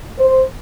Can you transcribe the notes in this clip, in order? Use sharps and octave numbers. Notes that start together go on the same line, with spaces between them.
C5